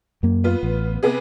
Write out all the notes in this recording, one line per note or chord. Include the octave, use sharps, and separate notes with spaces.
F#2 A#3
B3 F4
A1
C3 B3 G#4